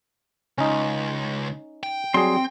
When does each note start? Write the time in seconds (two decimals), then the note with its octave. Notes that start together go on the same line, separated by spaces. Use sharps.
0.58 C#2 C#4 D#4
1.83 G5
2.14 F#3 G3 C4 G#4 C6